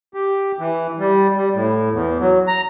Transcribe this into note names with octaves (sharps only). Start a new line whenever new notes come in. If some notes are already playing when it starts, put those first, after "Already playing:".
G4
E3
G3
G3
A2
E2
F#3
A#5